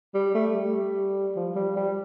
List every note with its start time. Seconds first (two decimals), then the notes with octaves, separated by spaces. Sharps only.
0.14 G3
0.35 A3
0.55 G3
1.36 F3
1.56 G3
1.76 G3